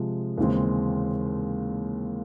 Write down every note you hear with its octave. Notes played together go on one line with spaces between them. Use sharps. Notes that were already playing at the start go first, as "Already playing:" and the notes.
Already playing: C3 F3 G#3
D#2 C#3 E3 G#3 C4